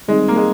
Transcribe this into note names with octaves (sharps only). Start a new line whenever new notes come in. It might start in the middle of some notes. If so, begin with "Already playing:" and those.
D#3 G3 G#3 C4 D#4
A#3
G#3